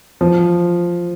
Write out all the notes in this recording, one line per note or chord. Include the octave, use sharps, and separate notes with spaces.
F3